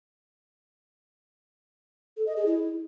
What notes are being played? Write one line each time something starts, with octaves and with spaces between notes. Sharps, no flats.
A4
D#5
G#4
E4